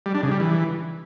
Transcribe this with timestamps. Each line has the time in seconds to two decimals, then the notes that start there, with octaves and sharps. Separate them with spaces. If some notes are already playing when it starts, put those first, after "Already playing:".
0.06 G3
0.14 D4
0.23 C#3
0.31 G3
0.40 E3